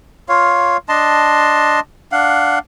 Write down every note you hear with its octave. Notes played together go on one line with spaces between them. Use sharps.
F4 C#5 F5
D4 D#5 A5 C6
D4 F5 F#5